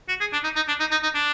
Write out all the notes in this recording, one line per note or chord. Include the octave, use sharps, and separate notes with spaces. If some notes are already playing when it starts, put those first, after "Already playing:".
F#4
G#4
D4
D#4
D#4
D4
D#4
D#4
D#4
D4